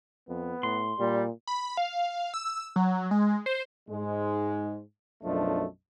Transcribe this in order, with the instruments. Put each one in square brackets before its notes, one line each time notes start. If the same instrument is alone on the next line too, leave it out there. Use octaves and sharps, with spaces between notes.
[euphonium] F2 [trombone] B3
[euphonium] A2 [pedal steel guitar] C6
[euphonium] A#2 [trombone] G3
[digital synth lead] B5
F5
E6
F#3
G#3
C5
[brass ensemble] G#2 G#3
B1 F#2 F3 A3 D4 D#5